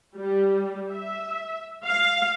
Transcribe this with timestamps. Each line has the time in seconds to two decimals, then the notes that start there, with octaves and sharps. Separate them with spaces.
0.15 G3
0.91 E5
1.86 F5